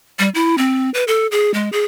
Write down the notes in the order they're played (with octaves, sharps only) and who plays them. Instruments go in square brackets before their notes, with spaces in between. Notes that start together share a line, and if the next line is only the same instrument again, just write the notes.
[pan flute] G3
E4
C4
B4
A4
G#4
G#3
G#4